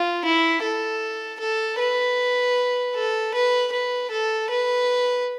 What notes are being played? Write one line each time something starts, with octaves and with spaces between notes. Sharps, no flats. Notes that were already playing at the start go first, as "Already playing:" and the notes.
Already playing: F4
E4
A4
A4
B4
A4
B4
B4
A4
B4